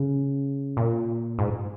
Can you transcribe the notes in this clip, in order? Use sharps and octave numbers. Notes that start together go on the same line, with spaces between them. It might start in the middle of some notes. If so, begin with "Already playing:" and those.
Already playing: C#3
A#2
G#2